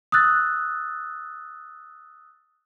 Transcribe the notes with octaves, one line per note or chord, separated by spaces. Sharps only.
D#6 E6 F#6 A6